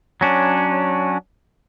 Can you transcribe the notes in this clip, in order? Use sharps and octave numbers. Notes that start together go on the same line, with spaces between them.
F#3 C#4 D4